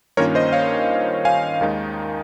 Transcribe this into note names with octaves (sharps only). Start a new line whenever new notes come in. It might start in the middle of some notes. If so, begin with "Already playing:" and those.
G2 D#3 A#3 C#4 F4 A#4 C#5
C5 D#5
C#5 F5
F5 G#5
D#2 D#3 G#3 D#4